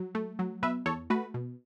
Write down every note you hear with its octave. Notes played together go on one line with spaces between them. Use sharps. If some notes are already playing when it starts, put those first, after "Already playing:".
Already playing: F#3
A3
F#3
B2 B4 E5
E2 A4 C#5
A3 F#4 B4
B2